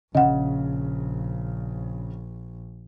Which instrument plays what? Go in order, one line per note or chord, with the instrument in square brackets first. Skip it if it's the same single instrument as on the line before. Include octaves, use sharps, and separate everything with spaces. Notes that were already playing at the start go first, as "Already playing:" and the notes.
[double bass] A#1 [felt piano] C#3 [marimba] D#5 F#5